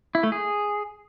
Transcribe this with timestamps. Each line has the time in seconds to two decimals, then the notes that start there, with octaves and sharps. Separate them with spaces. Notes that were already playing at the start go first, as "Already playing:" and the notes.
0.15 E4
0.23 A3
0.32 G#4